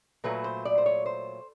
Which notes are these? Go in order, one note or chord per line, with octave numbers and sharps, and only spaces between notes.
A#2 F#3 A3 B4
C5
D5
C5
C#5
C5